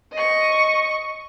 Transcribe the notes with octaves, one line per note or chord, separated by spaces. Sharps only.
D#5 C#6